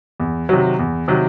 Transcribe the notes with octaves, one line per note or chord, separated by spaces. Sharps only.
E2
C3 D#3 F#3
E2
C3 D#3 F#3